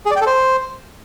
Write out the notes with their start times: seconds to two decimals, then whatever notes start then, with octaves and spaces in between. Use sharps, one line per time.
0.06 G#4
0.11 D5
0.16 G5
0.21 A4
0.27 C5